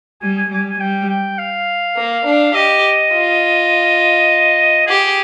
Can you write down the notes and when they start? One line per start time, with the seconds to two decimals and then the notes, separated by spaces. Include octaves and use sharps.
0.22 G3 G#5
0.38 G#5
0.51 G3 G#5
0.70 G#5
0.80 G3 G5
1.09 G5
1.39 F5
1.97 A#3
2.25 D4
2.55 G4 D#5
3.13 F4
4.87 G4 G#4